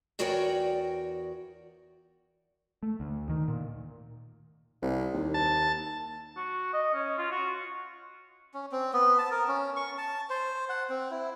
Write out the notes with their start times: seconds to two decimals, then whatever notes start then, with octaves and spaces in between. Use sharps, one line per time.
0.19 E2 F#4 A#4 C#5 D5 G5
2.83 A3
3.00 D2
3.30 D#3
3.48 A#2
4.82 C2
5.14 D#2
5.34 A5
6.37 F#4
6.73 D#5
6.94 C#4
7.18 F4
7.31 F#4
8.54 C#4
8.72 C4
8.93 B3
9.18 A5
9.31 A#4
9.48 C#4
9.76 C#6
9.98 A5
10.30 C5
10.69 F#5
10.90 C4
11.11 E4